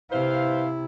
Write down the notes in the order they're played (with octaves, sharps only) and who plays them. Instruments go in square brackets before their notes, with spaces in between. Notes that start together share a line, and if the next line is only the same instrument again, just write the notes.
[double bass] C3 E4 [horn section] B4 C5 F5